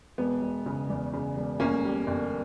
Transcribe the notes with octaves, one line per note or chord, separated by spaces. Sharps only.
E1 B3
E1
C#3
E2
C#3
E1
G1 A#3 C#4
G3
G1